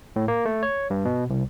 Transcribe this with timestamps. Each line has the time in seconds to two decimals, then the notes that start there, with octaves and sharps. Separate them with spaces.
0.16 A2
0.28 A#3
0.45 A3
0.63 C#5
0.90 G2
1.05 B2
1.30 C2